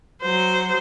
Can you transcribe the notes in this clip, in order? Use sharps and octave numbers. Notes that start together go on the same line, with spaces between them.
F#3 C5